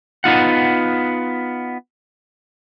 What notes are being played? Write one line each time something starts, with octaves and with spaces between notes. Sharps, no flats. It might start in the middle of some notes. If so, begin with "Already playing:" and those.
B3 D#4 F4 F#5